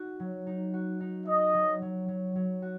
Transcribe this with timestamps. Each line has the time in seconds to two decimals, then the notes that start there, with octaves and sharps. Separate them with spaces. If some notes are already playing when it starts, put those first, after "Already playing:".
Already playing: D#4 F#4
0.20 F#3
0.47 D#4
0.73 F#4
1.00 D#4
1.27 D#4 D#5
1.54 F#3
1.82 F#3
2.08 F#3
2.35 F#3
2.62 F#4